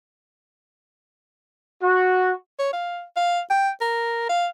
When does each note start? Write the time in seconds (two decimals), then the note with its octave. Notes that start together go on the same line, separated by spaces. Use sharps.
1.82 F#4
2.59 C#5
2.73 F5
3.17 F5
3.50 G5
3.81 A#4
4.29 F5